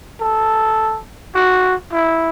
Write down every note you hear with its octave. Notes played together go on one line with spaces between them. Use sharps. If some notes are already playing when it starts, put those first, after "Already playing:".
A4
F#4
E4